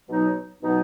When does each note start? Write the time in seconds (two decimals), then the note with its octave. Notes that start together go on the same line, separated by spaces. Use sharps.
0.07 B2 F#3 B3 D#4
0.62 B2 F#3 B3 D#4